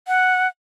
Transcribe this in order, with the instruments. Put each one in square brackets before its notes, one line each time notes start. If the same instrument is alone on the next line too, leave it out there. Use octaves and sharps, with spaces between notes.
[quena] F#5